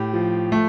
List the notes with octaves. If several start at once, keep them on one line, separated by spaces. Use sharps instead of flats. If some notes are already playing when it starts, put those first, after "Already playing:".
Already playing: A2 G4
F3
A3